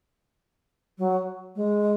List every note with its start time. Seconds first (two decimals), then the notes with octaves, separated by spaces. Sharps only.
0.98 F#3
1.56 G#3